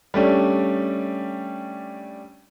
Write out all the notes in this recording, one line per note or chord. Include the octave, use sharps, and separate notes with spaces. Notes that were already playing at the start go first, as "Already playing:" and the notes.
G3 A3 C#4 D4